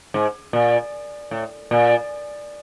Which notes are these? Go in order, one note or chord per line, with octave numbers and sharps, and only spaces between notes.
G#2
A#2
A2
A#2